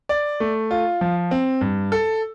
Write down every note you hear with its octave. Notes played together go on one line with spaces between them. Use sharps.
D5
A3
F4
F3
C4
G2
A4